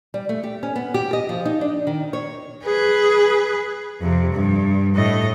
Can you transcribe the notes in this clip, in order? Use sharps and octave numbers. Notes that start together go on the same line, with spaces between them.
G3
A3
G4
C#4
B3
G4
D#5
F3
D#4
D4
D#3
C#5
G#4 B4
F2 C3
G2
A2 D#5